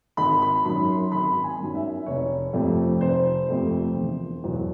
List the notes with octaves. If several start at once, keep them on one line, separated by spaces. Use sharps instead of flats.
G#1 B5
B5
F#2 D#3 F#3 B5
C6
G#1 B5
G#5
F#2 D#3 F#3
E5
F1 C#5
F2 C3 F3 A3
F1 C5
F2 C3 F3 A3
E1
E2 B2 F#3